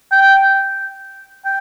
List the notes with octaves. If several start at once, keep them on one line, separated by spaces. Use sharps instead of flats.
G5
G5